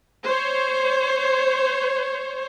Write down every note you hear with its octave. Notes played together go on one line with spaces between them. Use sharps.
C5 C#5